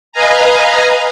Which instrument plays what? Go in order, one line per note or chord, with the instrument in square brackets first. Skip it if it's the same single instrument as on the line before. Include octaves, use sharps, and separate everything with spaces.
[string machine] B4 D#5 F5 G#5 A#5